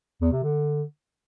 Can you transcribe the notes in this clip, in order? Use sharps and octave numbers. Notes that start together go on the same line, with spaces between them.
E2
C3
D3